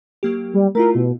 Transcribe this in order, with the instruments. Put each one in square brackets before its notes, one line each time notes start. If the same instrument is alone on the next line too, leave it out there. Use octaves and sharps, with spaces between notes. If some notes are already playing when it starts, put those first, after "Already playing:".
[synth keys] F#3 A#3 G4
[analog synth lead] G3
[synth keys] A3 E4 F4 [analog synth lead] A#4
[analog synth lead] B2